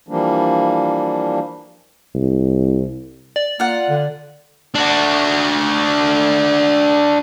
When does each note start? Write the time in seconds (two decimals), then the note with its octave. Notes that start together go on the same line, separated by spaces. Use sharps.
0.08 E3 F3 G3 A#3 D4
2.15 C2
3.36 D5
3.60 A#3 F4 F#5
3.90 D3
4.75 D4 F#4